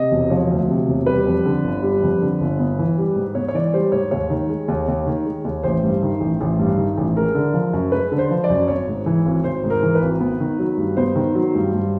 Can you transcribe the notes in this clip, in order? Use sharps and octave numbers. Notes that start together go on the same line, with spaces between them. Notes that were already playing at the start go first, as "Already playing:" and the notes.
Already playing: C3 D#5
E1
F3 C#5
D2
C3
E1
G3 B4
F2
D3
G1
G3
F2
D3
G1
B3
E3
G3
G#2
B3 C#5
C#5
E3 D5
G3 C5
G#2 C#5
D#2 C#5
D#3
G#3
D#2
D#2
D#3
G#3
D#2
A1 C5
G2
D#3
A1
A1
G2
D#3
A1
G#3 A#4
D3
F3
F#2
G#3 B4
D3
C5
F3
D5
F#2
G#1 C#5
G#2
E3
G#1
G#1 C5
G#2
A#4
E3
B4
G#1
B3
D#3
F#3
G2
B3 C5
D#3
F#3
G2
G2